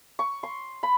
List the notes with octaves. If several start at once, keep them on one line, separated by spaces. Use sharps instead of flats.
C#6
C6
B5